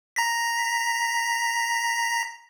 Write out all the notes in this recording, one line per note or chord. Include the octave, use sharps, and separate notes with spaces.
A#5 A#6 B6